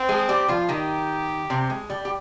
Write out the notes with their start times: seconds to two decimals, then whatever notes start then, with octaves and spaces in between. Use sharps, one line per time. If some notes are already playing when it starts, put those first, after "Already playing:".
Already playing: C4
0.09 G#3 G#4
0.29 G3 G4
0.48 F3 F4
0.69 D#3 D#4 G4
1.50 C3 C4
1.70 G#3
1.90 G3
2.05 G4